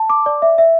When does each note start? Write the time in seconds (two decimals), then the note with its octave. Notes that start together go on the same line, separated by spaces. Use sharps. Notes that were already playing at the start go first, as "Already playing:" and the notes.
Already playing: A5
0.10 D6
0.26 D5
0.42 E5
0.58 E5